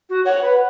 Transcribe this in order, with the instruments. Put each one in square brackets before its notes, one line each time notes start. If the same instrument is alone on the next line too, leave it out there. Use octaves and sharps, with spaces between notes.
[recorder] F#4
[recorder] C#5 [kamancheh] F#5
[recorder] B4